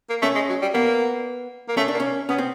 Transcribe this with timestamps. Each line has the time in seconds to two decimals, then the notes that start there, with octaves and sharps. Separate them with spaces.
0.10 A#3
0.22 A3 C#4
0.35 G#3
0.49 F#3
0.62 G3
0.74 A#3 B3
1.69 A#3
1.77 A3 C#4
1.88 D4
1.94 A#3
2.00 C#4
2.29 B3 C#4
2.38 C4